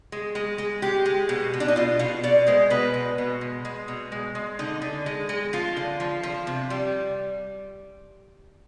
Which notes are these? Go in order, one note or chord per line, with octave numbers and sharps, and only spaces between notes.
G#3
G#3
G#3
G#3 G4
G#3
B2
B2
D4
D#4
B2 F4
B2 F4
B2 D5
G#3 C5
B2 B4
G#3
B2
G#3
G#3
B2
G#3
G#3
D3 D#4
D3
G#3
G#3
F3 F4
D3
F3
F3
C3
G3